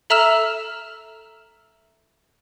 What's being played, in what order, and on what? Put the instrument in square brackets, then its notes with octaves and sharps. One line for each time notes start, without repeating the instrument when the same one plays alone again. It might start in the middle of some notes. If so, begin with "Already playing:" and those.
[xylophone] A4 E5 A#5 E6 F6 E7